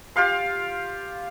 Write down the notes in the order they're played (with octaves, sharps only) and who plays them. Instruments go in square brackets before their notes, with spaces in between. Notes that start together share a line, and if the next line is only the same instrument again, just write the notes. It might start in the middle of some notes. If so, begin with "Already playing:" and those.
[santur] F4 G4 F5 C6